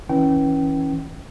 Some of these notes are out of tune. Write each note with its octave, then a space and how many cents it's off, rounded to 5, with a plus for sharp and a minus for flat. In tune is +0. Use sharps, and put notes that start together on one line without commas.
E3 -20 C#4 -10 G5 -30